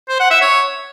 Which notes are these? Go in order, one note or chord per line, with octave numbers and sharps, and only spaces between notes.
C5
F#5
E5
C#5